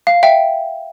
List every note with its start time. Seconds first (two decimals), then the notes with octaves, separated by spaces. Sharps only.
0.07 F5
0.23 E5 G5